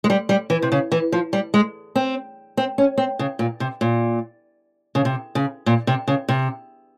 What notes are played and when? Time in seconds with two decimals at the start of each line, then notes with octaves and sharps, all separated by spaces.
0.04 G#3
0.10 G3
0.29 G3
0.50 E3
0.62 C3
0.72 C#3
0.92 E3
1.12 F3
1.33 G3
1.54 G#3
1.95 C4
2.57 C4
2.78 C#4
2.98 C4
3.19 C#3
3.39 A#2
3.60 C3
3.81 A#2
4.95 C#3
5.05 C3
5.35 C#3
5.66 A#2
5.87 C3
6.08 C#3
6.29 C3